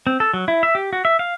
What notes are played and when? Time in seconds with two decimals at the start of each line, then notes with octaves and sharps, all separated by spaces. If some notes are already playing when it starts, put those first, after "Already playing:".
0.07 C4
0.20 A4
0.34 F#3
0.48 E4
0.63 E5
0.75 G4
0.93 F#4
1.05 E5
1.19 F5